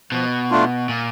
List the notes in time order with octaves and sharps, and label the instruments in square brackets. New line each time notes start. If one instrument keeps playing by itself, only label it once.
[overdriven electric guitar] B2 [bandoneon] F3
[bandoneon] A3 D4 F4
[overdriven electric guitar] A#2